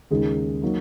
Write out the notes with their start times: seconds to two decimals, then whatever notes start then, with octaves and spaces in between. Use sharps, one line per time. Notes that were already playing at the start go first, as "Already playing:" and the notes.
0.11 D#2 C#3 G#3 D#4 G#4
0.62 F#3 A#3 D#4